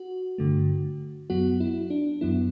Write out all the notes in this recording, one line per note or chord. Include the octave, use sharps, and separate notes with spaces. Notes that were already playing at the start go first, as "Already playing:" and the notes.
Already playing: F#4
G2 D3 A3
F#2 F#3 B3 F#4
E4
D4
F#2 F#3 B3 E4